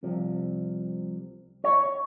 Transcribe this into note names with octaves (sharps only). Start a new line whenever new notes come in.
C2 C3 F3
C#5